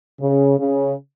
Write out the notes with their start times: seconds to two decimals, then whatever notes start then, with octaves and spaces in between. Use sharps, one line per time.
0.21 C#3
0.59 C#3